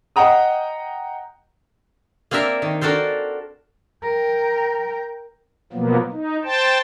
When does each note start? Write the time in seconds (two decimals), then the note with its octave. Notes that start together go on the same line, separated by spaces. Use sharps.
0.16 D#5 F#5 G5 A#5 D#6
2.31 A#3 C4 D4 A#4 E5
2.62 D#3
2.81 D4 F#4 A4 A#4 C5
4.02 A#4 G5
5.73 B2 F3 F#3 A#3 B3
6.12 D#4
6.44 C5 G5 A5